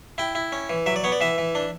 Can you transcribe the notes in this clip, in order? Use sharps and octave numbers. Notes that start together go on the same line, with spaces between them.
E4 G5
E4
C#4
E3
F#3 E5
D5
B3 C#5
D5
E3 E5
E3
D4